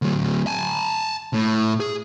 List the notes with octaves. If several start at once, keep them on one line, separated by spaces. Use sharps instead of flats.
D2 F#3
G#5 A5
A2
G#4